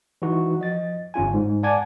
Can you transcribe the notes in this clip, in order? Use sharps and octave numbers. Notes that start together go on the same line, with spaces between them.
E3 D#4 F#4
F3 D#5 A6
G1 C#4 F4 G#5
G#2
D5 F#5 G#5 A5 D6 G#6